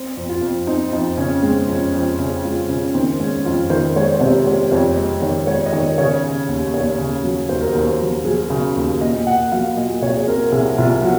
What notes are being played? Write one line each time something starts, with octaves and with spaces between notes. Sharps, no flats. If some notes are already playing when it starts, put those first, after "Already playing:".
Already playing: C4
F2
F4
F2
C4 D#4
F2 D#4
C#3 C#4
G#3 C4
F2 C#4
F2 C4
C#3 C#4
G#3 F4
C#3 C#4
D#3 C4
G#3 C#4
F2 F4
D#3 C5
G#3 C#5
C#5
C3 C5
G#3 C#5
F2 C#5
G#3 D#5
D#3 C#5
G#3 C#5
D#5
D#3 C#5
C#3 C#5
C#3
D#2
D#2 C#5
C#3
F#3
D#2 C5
A#4
D#2 C5
F#3
F#3 G#4
C#3
D#2
A#2 D#5
A#2 F#5
F#3 F5
A#2 D#5
C2 C#5
G#4
C4 A#4
C2 G#4
C2 F4
F#3 F#4